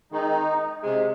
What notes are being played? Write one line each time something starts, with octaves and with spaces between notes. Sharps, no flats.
D#3 G#3 C4 D#4
C3 G#3